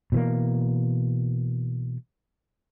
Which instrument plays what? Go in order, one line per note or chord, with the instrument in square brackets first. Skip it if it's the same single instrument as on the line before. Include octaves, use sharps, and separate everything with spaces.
[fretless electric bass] B2 E3 A#3